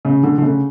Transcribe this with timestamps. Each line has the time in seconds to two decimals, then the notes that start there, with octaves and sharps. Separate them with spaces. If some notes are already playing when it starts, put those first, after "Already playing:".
0.05 C#3
0.23 D3
0.38 D3
0.42 C#3